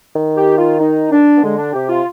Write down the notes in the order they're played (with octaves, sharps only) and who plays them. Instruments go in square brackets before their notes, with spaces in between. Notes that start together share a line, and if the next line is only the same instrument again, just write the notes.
[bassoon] D#3
[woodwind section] G4
F4
D#4
D4
B3
[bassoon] D3 [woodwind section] G#3
[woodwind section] D4
[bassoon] C3 [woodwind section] G4
[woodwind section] F4